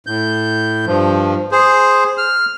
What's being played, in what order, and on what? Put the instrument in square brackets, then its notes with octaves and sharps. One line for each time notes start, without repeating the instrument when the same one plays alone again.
[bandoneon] A2 G6
G2 F3
G#4 C5
F6